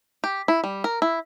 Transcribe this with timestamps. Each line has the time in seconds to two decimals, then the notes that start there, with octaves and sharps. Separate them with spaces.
0.24 G4
0.48 E4
0.64 G3
0.84 A#4
1.02 E4